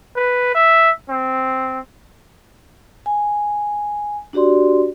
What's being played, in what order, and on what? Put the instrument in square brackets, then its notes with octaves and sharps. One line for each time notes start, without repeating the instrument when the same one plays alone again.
[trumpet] B4
E5
C4
[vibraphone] G#5
D4 F#4 G4 D5 C6